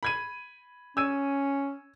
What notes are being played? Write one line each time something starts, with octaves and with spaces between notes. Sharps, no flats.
B5 G#6 D#7
C#4 E6 G#6 D#7